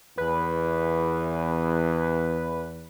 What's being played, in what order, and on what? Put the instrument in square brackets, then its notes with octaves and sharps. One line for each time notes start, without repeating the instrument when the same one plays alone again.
[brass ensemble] E2 [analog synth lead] B4